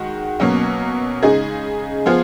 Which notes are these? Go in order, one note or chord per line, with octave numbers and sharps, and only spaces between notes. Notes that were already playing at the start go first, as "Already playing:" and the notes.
Already playing: D#3 G#3 F#4
B2 F#3 A#3 C#4
C#3 G#3 D#4 G#4
F3 B3 F4 G#4